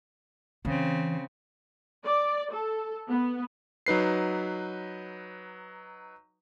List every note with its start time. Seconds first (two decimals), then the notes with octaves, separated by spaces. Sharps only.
0.65 C#3 E3 C4
2.05 D5
2.53 A4
3.09 B3
3.87 F#3 D#4 B4 C7